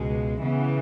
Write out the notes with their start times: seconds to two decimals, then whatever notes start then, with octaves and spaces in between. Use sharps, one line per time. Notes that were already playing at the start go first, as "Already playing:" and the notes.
Already playing: C#2 B2 G#3
0.40 C#3 E3 B3